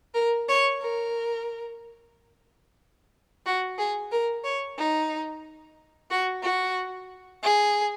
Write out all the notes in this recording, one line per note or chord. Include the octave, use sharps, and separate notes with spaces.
A#4
C#5
A#4
F#4
G#4
A#4
C#5
D#4
F#4
F#4
G#4